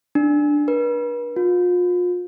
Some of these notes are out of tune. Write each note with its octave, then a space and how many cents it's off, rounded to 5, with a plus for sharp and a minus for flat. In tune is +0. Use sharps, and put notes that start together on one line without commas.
D4 +5
B4 -40
F4 +35